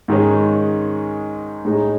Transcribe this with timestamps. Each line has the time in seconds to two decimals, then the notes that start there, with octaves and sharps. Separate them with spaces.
0.08 G#2 D#3 G#3 C#4
1.65 A2 G#3 D#4